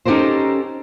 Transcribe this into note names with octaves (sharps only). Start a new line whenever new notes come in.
C#4 D#4 G4 A4 A#4 C5